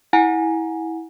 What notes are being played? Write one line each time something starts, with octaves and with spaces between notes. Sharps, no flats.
E4 F#5 G#5 A#5